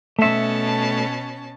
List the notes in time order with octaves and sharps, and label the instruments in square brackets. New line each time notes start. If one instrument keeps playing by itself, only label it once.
[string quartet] B2 C#4 A5 [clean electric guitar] A3 E5